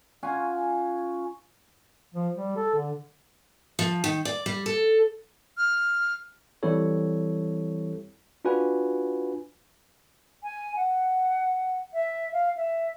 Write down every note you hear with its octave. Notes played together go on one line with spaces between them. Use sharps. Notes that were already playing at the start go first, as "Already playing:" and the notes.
C#4 F4 F#5 G#5
F3
G3
A4
D3
F3
D#3
D5
G3
A4
F6
E3 G3 C4 E4 A4 C#5
D4 F4 F#4 B4 G#5
G#5
F#5
E5
F5
E5